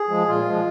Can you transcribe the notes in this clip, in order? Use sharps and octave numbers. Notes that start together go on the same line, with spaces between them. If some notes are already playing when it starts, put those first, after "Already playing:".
Already playing: G#4
F3 G#3
A#2 F4
F3 G#3